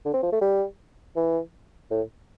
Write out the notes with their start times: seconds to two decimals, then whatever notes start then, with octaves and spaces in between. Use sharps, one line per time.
0.05 D3
0.14 C4
0.23 F3
0.33 A3
0.41 G3
1.16 E3
1.91 A2